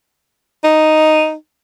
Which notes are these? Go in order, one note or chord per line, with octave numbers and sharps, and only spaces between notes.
D#4